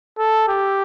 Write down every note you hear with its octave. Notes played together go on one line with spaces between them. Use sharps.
A4
G4